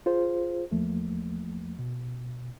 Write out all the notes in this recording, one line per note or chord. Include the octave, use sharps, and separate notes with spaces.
F4 G#4 C5
E2 F3 A3 A#3
B2